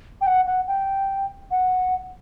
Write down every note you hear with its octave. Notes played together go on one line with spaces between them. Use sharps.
G5
F#5
F#5
G5
F#5